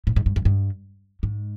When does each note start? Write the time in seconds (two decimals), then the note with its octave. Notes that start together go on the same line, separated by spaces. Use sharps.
0.07 A2
0.16 G#2
0.26 G2
0.36 F#2
0.45 G2
1.23 G#2